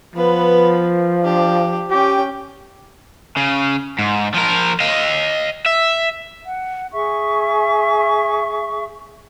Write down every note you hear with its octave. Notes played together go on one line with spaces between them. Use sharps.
F3 B3 B4
D4 G4
C#4 G4 G5
C#3
G#2
F3 A#4
D#5 F5
E5
F#5
G#4 E5 C#6